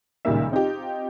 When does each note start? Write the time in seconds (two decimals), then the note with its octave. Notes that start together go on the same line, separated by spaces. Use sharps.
0.25 C#2 A#2 D#3 G3 A#3 E5
0.52 C4 D#4 F4 G4